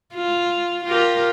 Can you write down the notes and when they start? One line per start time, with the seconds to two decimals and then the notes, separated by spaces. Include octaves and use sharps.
0.14 F4
0.84 F4 G4 A#4